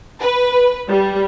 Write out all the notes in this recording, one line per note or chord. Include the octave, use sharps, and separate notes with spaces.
B4
G3